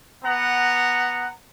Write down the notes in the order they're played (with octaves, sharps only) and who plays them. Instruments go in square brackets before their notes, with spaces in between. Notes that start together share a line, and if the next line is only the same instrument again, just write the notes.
[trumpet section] B3 F#5 A#5